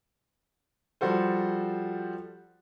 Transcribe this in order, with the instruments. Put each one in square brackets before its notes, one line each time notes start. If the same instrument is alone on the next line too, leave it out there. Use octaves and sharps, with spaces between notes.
[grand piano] F3 G3 F#4 A4 C5